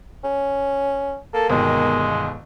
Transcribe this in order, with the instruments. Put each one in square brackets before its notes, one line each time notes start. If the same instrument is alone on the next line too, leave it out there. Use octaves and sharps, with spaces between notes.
[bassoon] C#4
[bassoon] A#3 [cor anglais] A4
[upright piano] G1 B2 D#3 [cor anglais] G#3